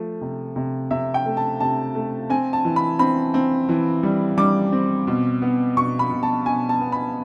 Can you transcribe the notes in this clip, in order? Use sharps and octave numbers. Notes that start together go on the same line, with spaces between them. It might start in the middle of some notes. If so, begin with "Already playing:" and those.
Already playing: F3 A3
C3
C3
C3 E5
G5
A3
A5
C3 A5
A3
C4 G#5
A5
E3
B5
C4 B5
C4
E3
G3
G3 D6
C4
B2
B3
B2 C#6
B5
B2
A5
B2 G#5
A5
B3
B5